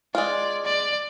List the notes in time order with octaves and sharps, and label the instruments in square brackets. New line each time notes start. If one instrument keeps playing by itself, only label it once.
[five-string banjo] G#3 F4 [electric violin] D5
[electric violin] D5